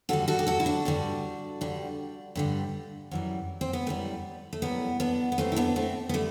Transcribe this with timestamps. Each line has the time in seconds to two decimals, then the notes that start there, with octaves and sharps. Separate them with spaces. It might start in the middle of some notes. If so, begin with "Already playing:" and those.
0.09 G2 D3 G3 F#4 A4
0.28 F#4 A4
0.39 G4
0.47 F#4 A4
0.60 E4
0.66 D4 F#4
0.85 G2 D3 G3
1.61 G2 D3 G3
2.35 G2 D3 G3
3.11 F#2 E3 G3
3.61 C4
3.73 B3
3.86 F#2 E3 G3 A3
4.53 A3
4.62 F#2 E3 G3 B3
5.00 B3 D4
5.32 B3
5.38 F#2 E3 G3 A3 C4
5.52 E4
5.56 B3 D4
5.76 A3 C4
6.09 B3
6.14 D3 G3 A3